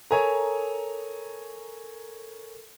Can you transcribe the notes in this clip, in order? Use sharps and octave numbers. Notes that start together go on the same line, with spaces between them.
A4 A#4 C#5 G#5 A#5